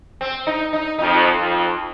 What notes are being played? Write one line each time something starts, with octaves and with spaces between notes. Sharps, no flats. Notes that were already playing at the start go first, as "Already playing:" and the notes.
C4
D#4
D#4
F2 D#4
F2